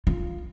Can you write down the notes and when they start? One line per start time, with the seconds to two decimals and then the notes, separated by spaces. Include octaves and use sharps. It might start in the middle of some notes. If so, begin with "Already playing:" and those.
0.07 F4